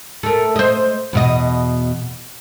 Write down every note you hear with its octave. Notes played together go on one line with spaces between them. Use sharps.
A3 A#4
C5 D#5
E2 B2 D#5